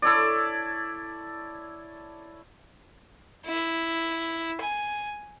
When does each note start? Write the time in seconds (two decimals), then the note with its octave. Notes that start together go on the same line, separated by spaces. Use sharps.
0.02 E4 A4 C#5 D5
3.46 E4
4.61 G#5